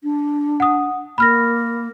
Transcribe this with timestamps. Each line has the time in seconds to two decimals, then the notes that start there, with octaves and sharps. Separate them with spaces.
0.03 D4
0.60 F#5 D#6
1.18 A#3 B5 F6 A#6